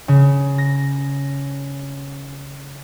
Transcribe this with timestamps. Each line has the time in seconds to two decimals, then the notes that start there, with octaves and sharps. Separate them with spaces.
0.08 C#3
0.58 A#6